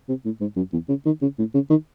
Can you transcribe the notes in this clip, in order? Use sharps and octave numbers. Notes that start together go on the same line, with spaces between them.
C3
A2
G#2
F#2
E2
C#3
D#3
C#3
A2
C#3
D#3